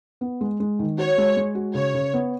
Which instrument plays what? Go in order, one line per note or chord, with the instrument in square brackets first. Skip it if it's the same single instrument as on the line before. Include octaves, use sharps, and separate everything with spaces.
[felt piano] B3
G#3
G#3
D#3
[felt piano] F#4 [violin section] C#5
[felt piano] G#3
G#3
F#4
[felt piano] C#3 [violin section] C#5
[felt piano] C#3
B3